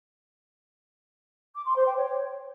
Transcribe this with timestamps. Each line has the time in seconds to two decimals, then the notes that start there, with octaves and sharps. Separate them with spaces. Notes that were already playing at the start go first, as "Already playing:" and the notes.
1.55 D6
1.65 C6
1.76 C5
1.86 G5
1.96 C#5